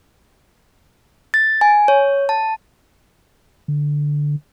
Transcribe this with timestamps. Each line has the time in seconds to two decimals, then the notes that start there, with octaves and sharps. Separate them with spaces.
1.34 A6
1.61 G#5
1.88 C#5
2.29 A5
3.68 D3